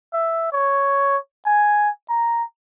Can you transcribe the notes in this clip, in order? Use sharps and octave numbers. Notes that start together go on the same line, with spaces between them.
E5
C#5
G#5
A#5